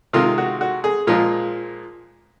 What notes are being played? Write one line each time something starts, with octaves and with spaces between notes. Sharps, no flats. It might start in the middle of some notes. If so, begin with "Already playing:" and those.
C3 D#3 G#3 F4
F#4
F#4
G#4
A#2 F3 G#3 F4